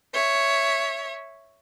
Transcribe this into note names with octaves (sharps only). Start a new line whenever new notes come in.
C#5 E5